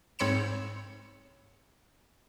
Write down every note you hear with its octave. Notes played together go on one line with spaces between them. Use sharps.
G#2 C4 C#5 B5 C#7 E7